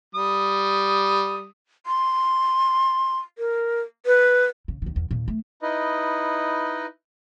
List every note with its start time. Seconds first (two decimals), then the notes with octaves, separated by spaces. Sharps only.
0.15 G3 D#6
1.86 C6
3.38 A#4
4.06 B4
4.68 C#3
4.82 D#2 D#3
4.96 E2
5.11 D#2 A#2
5.28 A3
5.62 D#4 E4 B4 D#5